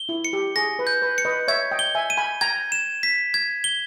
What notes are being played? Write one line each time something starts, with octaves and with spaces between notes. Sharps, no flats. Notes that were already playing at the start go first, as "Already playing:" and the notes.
Already playing: G7
E4
C#7
G4
G#4 A#6
B4
G6
B4
C#7
B4 D#5
C#5 E5 G#6
D#5 G5
G7
E5 G#5
D#7
G#5 B5
G5 A#5 G#6
E7
B6
G#6
G7